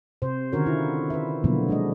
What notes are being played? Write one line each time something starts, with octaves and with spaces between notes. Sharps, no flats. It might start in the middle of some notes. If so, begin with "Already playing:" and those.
C3 C5
D3 D#3 C#4 F#4 A#4 C#5
E4 F4
B4 E5
B2 D3 F3 F#3 A#3 B3
G#3 D4 D#5